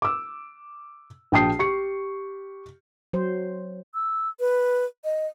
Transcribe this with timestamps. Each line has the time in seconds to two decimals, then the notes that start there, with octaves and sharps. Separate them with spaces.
0.02 D6 E6
1.32 A#1 F#4 G5 A5 D#6 C7
1.59 G4 C#6 C#7
3.13 F#3 C5
3.94 E6
4.40 B4
5.04 D#5